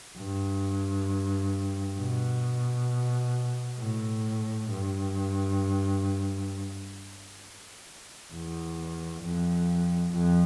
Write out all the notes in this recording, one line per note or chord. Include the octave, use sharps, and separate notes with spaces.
G2
B2
A2
G2
E2
F2
F2